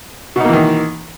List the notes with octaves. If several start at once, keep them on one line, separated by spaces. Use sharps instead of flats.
B2 D#3 E3 A#3 D#4